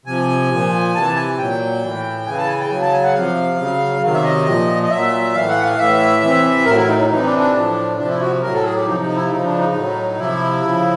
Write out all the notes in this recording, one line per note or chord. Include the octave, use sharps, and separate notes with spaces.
C3 F3 G#5
A#2 F3
C3 E3 A5
G#5
A#2 F#3 G5
A2 E3
C#3 E3 G#5
A5
G#5
G5
C#3 F#3 G#5
A5
G#5
F#5
C3 F3 F5
C#3 F#3
C3 D#3 F#3 F5
E5
D#5
A#2 F3
D#5
A#2 F#3 E5
A2 E3 F5
F#5
F5
A2 E3 E5
C3 E3
A2 F#3 A#4
E4
D#4
D#4
C3 E3 D#4
D4
D4
A2 F3
C3 F3 D4
E4
F#4
A2 F#3 A#4
A4
G#4
G4
C3 F3 D#4
D#4
E4
C#3 F3 D#4
D4
D#4
A2 F#3
C3 F3 E4
C#3 F3